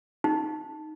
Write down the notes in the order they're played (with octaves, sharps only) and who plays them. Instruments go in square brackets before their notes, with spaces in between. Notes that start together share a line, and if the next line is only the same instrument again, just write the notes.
[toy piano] D#4